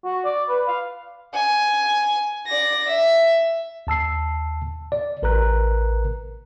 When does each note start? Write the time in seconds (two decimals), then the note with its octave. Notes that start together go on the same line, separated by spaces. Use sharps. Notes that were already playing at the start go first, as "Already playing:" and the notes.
0.05 F#4
0.25 D5
0.49 B4
0.68 F5
1.34 G#5
2.46 D5 A#6
2.87 E5
3.87 D#2 A5 E6 C7
4.92 D5
5.22 A1 A#4 B4 A#5 F#6